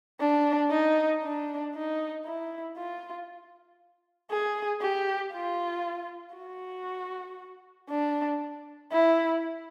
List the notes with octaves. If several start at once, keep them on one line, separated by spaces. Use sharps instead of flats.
D4
D#4
D4
D#4
E4
F4
G#4
G4
F4
F#4
D4
E4